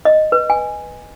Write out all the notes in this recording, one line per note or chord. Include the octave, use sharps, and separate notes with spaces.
D#5
B4
G#5